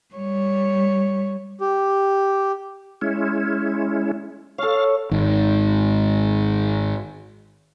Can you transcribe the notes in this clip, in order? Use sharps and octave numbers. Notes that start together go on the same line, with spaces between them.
G3 C#5
G4
G#3 C#4 E4
A4 C#5 F5
G#1 G#2